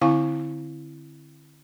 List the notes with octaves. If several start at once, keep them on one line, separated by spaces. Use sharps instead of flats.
D3 C4 E4 F5 G#5 C#6